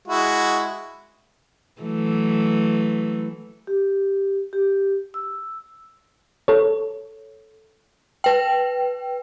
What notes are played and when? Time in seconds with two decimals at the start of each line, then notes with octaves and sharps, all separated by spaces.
0.08 G#3 E4 F#4
1.82 E3 F#3 A3
3.67 G4
4.53 G4
5.14 E6
6.48 A4 C#5
8.24 B4 G5